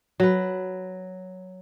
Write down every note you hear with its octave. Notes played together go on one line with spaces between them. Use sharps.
F#3 B4